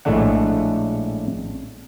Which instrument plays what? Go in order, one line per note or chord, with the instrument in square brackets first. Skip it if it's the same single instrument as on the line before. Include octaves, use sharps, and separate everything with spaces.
[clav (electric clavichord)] A#1 A2 G#3 A3 D4 F#5